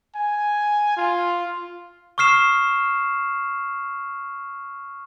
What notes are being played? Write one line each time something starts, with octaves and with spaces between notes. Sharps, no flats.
G#5
F4
C#6 D#6 F6 C7 E7